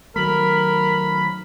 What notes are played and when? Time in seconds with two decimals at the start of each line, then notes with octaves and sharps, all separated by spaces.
0.16 D#3 F#3 A3 A#4 B5